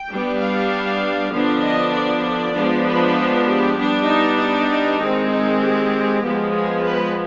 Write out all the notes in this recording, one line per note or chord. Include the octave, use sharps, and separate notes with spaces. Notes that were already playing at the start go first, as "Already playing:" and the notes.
Already playing: G5
G3 B3 D4
F5
D3 F3 B3 D4
D#5
D5
D5
F3 G#3 B3 D4
B4
G4
G3 B3 D4
D#4
D#4
D#3 G#3 C4
D#4
G4
F3 G#3 B3
G#4
B4